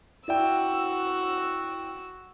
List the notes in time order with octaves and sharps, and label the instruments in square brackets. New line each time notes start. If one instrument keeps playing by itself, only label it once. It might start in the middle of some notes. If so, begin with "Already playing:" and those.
[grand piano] E4 D5 G5 [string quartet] F#4 E6